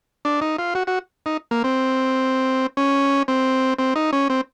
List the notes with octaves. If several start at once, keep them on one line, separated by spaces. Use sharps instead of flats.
D4
D#4
F4
F#4
F#4
D#4
A#3
C4
C#4
C4
C4
D#4
C#4
C4